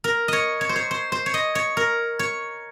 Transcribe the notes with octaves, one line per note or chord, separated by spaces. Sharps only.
A#4
C#5 D#5
C#5
C5
C#5
C5
C5
C#5
D#5
C#5
A#4
C#5